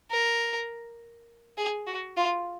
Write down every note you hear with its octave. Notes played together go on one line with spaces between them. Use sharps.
A#4
G#4
F#4
F4